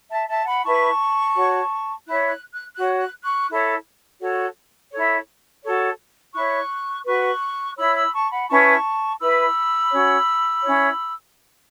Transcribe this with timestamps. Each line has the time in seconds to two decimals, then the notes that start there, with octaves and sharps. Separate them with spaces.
0.09 E5 A5
0.27 E5 A5
0.45 F#5 B5
0.63 E4 B4 A5 C#6
1.34 F#4 C#5
2.06 E4 C#5 F#6
2.29 F#6
2.52 F#6
2.75 F#4 C#5 F#6
2.98 F#6
3.21 C#6 F#6
3.48 E4 A4 C#5
4.20 F#4 A4 C#5
4.91 E4 A4 C#5
5.63 F#4 A4 C#5
6.34 E4 C#5 C#6 F#6
7.05 F#4 B4 C#6 F#6
7.76 E4 C#5 B5 E6
7.95 B5 E6
8.12 A5 C#6
8.30 F#5 B5
8.48 C#4 E4 B4 A5 C#6
9.19 E4 B4 B5 E6
9.90 C#4 F#4 C#5
10.62 C#4 E4 C#5